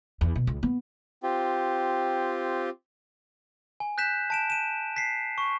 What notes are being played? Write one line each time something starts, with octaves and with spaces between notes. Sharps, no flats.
E2
B2
C#2
B3
C4 F4 G4
G#5
F#6 G6 B6 E7
A5 D7 E7
D#7 E7
B6 C7
C#6